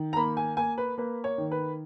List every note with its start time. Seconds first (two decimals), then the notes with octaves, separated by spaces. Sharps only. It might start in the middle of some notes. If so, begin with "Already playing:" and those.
Already playing: D#3
0.13 A#5
0.16 A#3 B5
0.37 G#5
0.57 A#3 G#5
0.78 B4
0.98 A#3 B4
1.24 C#5
1.38 D#3
1.52 B4